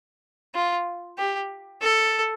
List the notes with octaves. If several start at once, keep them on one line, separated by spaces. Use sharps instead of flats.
F4
G4
A4